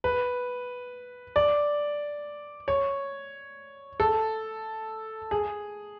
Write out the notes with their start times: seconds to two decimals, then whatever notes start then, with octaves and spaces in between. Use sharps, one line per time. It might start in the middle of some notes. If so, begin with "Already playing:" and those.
0.04 B4
1.36 D5
2.68 C#5
4.00 A4
5.31 G#4